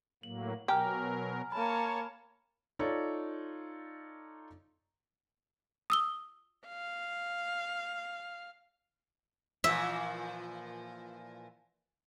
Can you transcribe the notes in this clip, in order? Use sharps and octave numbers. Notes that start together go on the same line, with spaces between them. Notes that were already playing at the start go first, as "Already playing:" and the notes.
A2 F#3 A#3 F#7
B2 F#3 G4 A#4 G#5 A#5 F6
A#3 C#5 A5 B5
D#4 F4 A4 C#5 D5
D#6 E6 G7
F5
A#2 E3 F3 E5